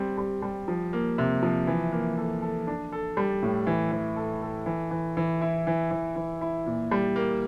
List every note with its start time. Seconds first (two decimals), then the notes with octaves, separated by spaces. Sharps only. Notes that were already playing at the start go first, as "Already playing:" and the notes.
Already playing: G3 C4
0.18 G3
0.42 G3
0.68 F3
0.93 A#3
1.18 C3
1.43 F3
1.67 E3
1.92 A#3
2.17 A4
2.42 A4
2.67 D4
2.92 A4
3.17 G3
3.43 A2
3.67 E3
3.92 E3
4.16 A4
4.42 A4
4.66 E3
4.91 E3
5.17 E3
5.41 E4
5.67 E3
5.91 E3
6.16 E3
6.41 E4
6.66 A#2
6.91 G3
7.16 A#3